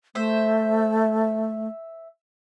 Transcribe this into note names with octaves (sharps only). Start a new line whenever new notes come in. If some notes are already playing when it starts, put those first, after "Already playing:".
A3 C5 E5